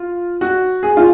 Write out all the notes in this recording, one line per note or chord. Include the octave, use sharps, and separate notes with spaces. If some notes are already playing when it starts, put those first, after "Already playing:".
Already playing: F4
F#4
G#4
F4